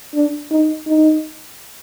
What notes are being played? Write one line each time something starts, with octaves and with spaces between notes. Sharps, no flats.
D4
D#4
D#4